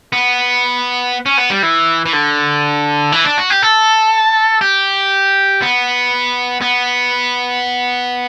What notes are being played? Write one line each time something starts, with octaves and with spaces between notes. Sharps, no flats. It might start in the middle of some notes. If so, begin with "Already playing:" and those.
B3
C#4
B3
G3
E3
E3
D3
E3
D4
F#4
G4
A4
G4
B3
B3